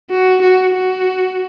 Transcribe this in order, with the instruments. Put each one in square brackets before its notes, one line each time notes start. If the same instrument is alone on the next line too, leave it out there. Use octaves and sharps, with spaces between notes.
[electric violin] F#4
F#4
F#4